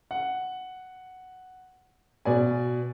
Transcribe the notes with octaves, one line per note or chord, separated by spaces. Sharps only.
F#5
B2 D5 G#5